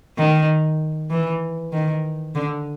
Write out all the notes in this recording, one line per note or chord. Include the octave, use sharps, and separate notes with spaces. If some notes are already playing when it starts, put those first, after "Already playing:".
D#3
E3
D#3
D3